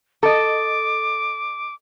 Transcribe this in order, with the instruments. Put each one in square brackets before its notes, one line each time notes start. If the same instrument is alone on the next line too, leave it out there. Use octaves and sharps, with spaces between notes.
[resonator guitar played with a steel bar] A4 D#5 [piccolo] D6